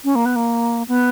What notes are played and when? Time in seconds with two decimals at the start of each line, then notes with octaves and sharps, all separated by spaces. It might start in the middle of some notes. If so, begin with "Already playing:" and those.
0.04 C#4
0.15 A#3
0.26 B3
0.36 A#3
0.88 B3